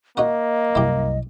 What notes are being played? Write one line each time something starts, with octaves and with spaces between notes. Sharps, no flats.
A#3 D#4 F#4 D#5 F#5
C2 F#2 E4 G4